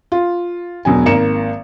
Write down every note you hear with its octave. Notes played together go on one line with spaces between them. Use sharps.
F4
E1 B2 F#3 G#5
G#1 A#3 A#5 C#7 E7